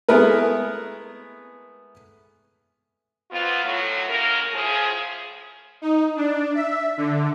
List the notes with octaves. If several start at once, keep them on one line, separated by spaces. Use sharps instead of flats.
G#3 A3 B3 E4 A#4 B4
F2 B3 F4
A2 F#3
C#3 G#3 A#3 A#4
A2 F3 G#4
D#4
D4
E5
D3